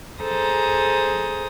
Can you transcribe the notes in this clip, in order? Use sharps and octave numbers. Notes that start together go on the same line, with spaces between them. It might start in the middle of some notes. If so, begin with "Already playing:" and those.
G#4 A4 C5 A#5 D#6